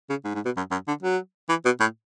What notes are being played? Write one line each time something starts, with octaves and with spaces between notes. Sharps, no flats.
C#3
G#2
G#2
B2
F#2
F#2
D3
F#3
E3
B2
A2